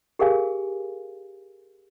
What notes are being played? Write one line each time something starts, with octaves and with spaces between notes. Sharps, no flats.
G4 G#4 A#4 F5 G#5